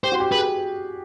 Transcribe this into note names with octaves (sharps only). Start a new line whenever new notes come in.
G4 C5
F#4
G4
G#4 B4